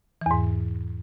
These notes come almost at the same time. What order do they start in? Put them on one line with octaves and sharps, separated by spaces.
E3 E2 G#2